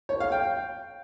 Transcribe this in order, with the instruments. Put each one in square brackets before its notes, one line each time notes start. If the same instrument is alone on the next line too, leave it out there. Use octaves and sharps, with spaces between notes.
[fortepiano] C#5
F5
G5